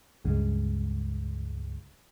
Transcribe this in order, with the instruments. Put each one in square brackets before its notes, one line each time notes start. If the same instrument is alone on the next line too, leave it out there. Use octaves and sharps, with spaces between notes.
[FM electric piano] C#2 G2 C#3 G#3